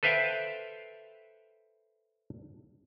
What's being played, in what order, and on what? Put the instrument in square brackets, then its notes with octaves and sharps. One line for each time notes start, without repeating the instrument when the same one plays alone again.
[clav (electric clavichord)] A4 B4 C5 E5 F5 G5